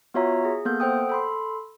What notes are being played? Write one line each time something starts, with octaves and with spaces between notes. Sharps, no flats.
B3 F4 F#4 C#5 E5 A#5
G#4
A#3 B3 A4 G6
A4 C5 F#5 G5 D#6
A4 B5 C6